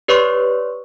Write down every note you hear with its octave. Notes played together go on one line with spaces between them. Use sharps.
G4 B4 C#5 D5 C6 C#6